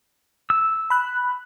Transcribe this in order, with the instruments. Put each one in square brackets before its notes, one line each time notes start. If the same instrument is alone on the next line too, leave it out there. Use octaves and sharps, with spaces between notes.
[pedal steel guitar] E6
[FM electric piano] B5 F#6